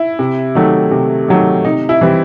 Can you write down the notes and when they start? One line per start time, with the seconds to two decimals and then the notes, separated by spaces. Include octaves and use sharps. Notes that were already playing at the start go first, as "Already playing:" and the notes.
Already playing: E4
0.19 C3
0.55 D#3 F#3 A3
0.91 C3
1.28 D#3 F#3 A3
1.64 C3 D#4
1.89 E4
2.01 E3 G3 C4